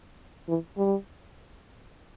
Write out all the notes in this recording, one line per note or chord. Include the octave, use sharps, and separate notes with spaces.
E3
G3